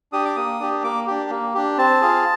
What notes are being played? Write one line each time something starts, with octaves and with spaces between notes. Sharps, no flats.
D4 G4 D#6
D6
A#3 D#6
D4 G4
A#3 D6
D4 G4
A#3
D4 G4
C4 A5
F4 G#4